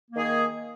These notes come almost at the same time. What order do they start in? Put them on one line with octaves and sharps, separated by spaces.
A#3 D#3 G#4